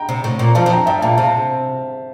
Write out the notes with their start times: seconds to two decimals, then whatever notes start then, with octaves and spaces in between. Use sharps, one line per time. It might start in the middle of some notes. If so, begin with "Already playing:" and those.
Already playing: G5 A#5
0.09 C3
0.24 A2
0.39 A#2
0.55 F2 F3 F5 A5
0.66 F2 F3
0.71 G5 A#5
0.86 G2 E5 G5
1.01 A#2 F5 A5
1.17 C3 F5 A5